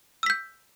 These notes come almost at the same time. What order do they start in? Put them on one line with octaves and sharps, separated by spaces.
E6 B6 G6